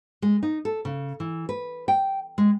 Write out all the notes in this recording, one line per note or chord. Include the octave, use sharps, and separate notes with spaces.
G#3
D#4
A4
C#3
E3
B4
G5
G#3